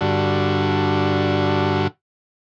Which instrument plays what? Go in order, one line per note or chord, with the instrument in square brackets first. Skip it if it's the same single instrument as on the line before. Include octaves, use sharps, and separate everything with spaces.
[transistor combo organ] G2 D3 F#4